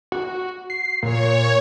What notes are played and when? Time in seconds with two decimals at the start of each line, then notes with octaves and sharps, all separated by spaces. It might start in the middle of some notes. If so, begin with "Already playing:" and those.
0.12 F#4
0.70 C7
1.03 A#2 C#5